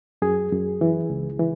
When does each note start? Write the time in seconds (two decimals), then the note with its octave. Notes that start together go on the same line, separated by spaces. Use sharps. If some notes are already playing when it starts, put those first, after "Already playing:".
0.22 F#2 G#4
0.52 F#2
0.81 E3
1.10 C#2
1.39 E3